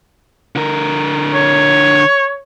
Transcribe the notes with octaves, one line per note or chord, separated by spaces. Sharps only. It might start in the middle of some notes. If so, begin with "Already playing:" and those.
D3 A#4
C#5